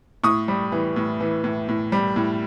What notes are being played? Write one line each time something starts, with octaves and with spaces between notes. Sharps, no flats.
A2 C#6 D#6
G3
E3
A2
E3
A2
A2
G3
A2